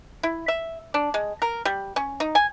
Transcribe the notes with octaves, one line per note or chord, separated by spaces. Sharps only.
E4
E5
D4
G#3
A#4
G3
C#4
D#4
G#5